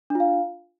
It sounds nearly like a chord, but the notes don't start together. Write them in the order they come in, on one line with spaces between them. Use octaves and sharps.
D4 F4 F5